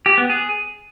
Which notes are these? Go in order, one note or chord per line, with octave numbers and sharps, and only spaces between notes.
G4
B3
G#4